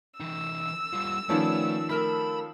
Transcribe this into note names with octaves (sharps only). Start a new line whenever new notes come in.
E3 D#4 E6
G3 F4
D#3 F3 A3 B3 C#4 G#4 D5
A3 A#4 A5 B5